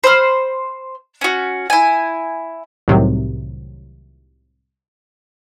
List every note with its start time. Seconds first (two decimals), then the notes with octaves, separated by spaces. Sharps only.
0.04 C5 B5 F6
1.21 C#4 F#4
1.70 E4 G#5
2.88 C2 A2 C3 D#3 F#3